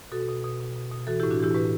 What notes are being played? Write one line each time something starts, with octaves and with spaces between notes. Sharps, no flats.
B2 F#4 A4
B2
B2
B2
B2
B2
E3 F#4 A4
A2 E4 G4
D4 F#4
E3 E4 G4
A2 G4 B4